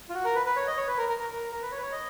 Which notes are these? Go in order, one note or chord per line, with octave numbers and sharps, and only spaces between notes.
F4
F#4
A#4
B4
B4
C#5
D#5
C#5
B4
A#4
A#4
A#4
A#4
A#4
B4
C#5
B4
C#5
D#5